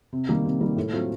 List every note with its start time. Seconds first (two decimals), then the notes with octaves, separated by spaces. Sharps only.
0.13 C3
0.29 D#3 G3 A#3
0.45 C3
0.61 D#3 G3 A#3
0.76 A2
0.92 F#3 A3 C4 F4